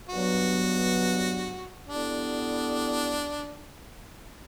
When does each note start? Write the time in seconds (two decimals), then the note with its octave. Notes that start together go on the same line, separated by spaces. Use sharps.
0.08 G2 F#3 B3 F#4
1.88 G3 B3 D4 E4 A4